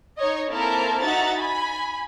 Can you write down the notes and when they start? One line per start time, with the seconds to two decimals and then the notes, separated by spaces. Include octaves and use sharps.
0.18 D#4 C#5 D#5
0.50 A#3 C4 E4 A4 A#4 A5
1.03 D#4 F#4 E5 F#5 A#5 A6
1.37 G#5 B5